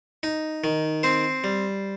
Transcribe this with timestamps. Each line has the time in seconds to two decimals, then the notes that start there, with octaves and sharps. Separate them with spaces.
0.23 D#4
0.64 D#3
1.03 C4 C5
1.44 G3